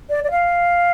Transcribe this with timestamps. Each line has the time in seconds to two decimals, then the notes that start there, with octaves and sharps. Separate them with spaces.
0.10 D5
0.24 D5
0.31 F5